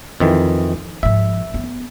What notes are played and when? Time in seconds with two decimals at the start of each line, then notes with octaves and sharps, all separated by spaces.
0.20 F2 D#3 E3
1.03 G#2 F3 E5
1.54 B3